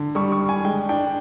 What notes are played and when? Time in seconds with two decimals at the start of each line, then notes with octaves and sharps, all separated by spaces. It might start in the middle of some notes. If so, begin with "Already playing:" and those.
Already playing: D3
0.15 G3 C#6
0.32 C#6
0.40 D4
0.49 G#5
0.64 G#3 G5
0.89 D4 G5